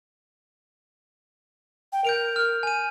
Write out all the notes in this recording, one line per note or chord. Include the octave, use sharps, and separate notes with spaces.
G5
A#4 G6 D7 F7
F6
G#5 D#7